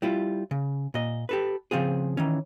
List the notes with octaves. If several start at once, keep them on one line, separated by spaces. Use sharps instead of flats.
G3 E4 F4
C#3
A#2 D#5
G4 A4 B4
C#3 F3 C4 F4 G#4
D#3 E3 C#4